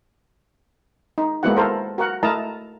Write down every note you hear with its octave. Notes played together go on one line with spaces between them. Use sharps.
D#4
G#3 A#3 B3 E4 F#4 F#5
E4 A4 A#4 C5
F#4 A#4 F#5
A3 E4 A#4 D#5 A5 A#5